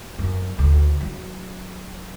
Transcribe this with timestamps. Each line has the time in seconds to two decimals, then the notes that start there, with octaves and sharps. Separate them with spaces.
0.19 F#2
0.59 D2
1.00 F#3